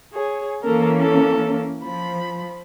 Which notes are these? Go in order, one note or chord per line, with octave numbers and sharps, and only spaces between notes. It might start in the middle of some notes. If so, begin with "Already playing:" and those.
G#4 C#5
E3 A#3 C#4 A4 A#4
A4
F3 B5